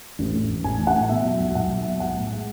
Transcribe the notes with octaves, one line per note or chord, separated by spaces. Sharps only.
A1
A2
A1
A1 G#5
A1
F#5
A2
B2 E5
F#3
B1
B1 F#5
F#3
E5
B2
B1 F#5
A2
G#3